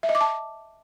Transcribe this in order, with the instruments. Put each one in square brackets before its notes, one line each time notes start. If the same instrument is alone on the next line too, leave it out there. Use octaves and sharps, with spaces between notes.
[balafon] E5
D#5
D6
A5